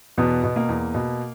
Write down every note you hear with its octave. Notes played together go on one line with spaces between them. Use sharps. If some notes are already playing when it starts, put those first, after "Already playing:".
E2 B2 B3
B2
A#3
E2
B2